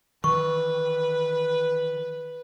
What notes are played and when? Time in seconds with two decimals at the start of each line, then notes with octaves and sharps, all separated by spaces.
0.24 D#3 E3 B4 C#6